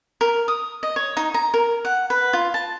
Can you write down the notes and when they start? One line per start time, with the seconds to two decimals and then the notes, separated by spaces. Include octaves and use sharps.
0.21 A#4
0.48 D#6
0.83 D#5
0.96 C#5
1.17 D#4
1.34 A#5
1.54 A#4
1.85 F#5
2.10 B4
2.33 F4
2.54 A5